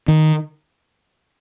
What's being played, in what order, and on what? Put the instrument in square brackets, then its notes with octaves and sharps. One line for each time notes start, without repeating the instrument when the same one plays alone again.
[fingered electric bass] D#3